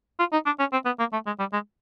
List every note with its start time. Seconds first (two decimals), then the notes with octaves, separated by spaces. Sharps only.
0.19 F4
0.32 D#4
0.46 D4
0.59 C#4
0.72 C4
0.86 B3
0.99 A#3
1.13 A3
1.26 G#3
1.39 G3
1.53 G#3